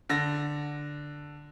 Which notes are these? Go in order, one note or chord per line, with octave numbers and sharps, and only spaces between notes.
D3 A#6